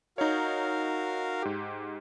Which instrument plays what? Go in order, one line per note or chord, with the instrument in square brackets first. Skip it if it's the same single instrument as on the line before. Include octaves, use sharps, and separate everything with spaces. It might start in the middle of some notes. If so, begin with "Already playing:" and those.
[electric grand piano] D#4 C#5 [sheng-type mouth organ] F#4 A#4 F5
[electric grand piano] G#2 G4